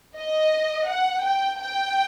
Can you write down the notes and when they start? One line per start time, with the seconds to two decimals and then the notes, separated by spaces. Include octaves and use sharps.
0.17 D#5
0.88 F#5
1.23 G5
1.60 G5